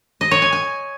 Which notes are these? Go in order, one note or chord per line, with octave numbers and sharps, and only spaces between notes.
D#5
C#5
G#5
G#5